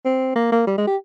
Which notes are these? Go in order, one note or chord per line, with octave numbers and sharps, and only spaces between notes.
C4
A#3
A#3
G3
G#3
G4